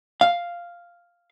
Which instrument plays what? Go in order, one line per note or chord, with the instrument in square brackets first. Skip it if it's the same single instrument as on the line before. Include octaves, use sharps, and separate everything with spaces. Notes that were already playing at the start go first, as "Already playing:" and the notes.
[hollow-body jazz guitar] F5